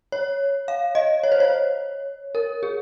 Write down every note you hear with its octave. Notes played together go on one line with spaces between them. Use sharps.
C#5
F5
D#5
C#5
C5
C#5
A#4
G#4